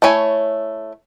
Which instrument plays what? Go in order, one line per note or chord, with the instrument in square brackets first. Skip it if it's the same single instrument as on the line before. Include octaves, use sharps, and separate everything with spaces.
[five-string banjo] A3 E4 C#5 G#5